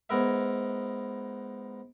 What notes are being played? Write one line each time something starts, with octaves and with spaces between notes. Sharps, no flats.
G#2 B3 A#4 E5